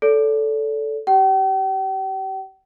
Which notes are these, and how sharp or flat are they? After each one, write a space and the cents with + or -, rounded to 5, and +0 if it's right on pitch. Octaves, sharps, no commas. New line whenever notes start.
A4 -5 D5 -40
G4 -20 G5 -40